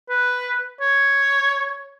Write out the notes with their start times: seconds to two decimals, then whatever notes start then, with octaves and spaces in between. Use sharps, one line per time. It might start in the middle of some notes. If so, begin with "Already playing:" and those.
0.09 B4
0.81 C#5